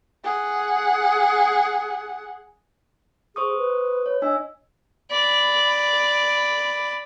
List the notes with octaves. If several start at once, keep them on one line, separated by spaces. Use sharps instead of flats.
G#4 F#5
G#4 C5 C#6 D#6
B4
C#5
D4 D#5 G#5 E6
D5 B5